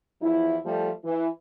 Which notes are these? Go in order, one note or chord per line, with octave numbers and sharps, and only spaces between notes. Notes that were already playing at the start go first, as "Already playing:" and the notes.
E2 F3 E4
F3 G3 A3
E3